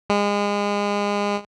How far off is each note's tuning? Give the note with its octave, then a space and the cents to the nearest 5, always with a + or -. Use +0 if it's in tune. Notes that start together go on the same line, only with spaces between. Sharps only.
G#3 -30